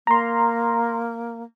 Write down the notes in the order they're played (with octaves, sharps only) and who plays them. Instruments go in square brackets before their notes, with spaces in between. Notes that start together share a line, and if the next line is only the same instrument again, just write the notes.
[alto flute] A#3 [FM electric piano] A#5 C6